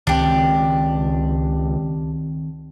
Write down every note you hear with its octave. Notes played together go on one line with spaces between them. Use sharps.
C#2 D#3 C4 D4 G4